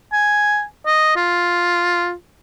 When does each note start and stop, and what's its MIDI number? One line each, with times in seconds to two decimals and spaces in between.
0.13 0.63 80
0.86 1.15 75
1.16 2.13 65